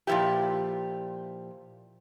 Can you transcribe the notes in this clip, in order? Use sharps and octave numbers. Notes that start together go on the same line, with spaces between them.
A#2 F3 G#3 E4 G4